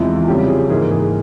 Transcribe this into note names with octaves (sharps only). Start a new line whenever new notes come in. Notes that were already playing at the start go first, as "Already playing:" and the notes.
Already playing: E2 C3 F3 G#3 E4
F4
F2 C#3 G3 G4
G#4
G#2 E3 A#3 G#4
G#4